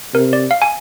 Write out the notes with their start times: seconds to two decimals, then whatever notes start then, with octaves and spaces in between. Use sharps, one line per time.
0.14 C3 A#4
0.33 D5
0.51 F5
0.62 G#5